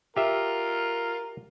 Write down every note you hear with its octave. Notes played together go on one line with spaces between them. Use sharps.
F4 G4 A#4 E5